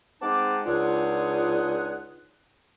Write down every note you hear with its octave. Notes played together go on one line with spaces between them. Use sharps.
G#3 C4 D#4 F#5 A5 D6
C#2 D4 D#4 F4 G#4 F#5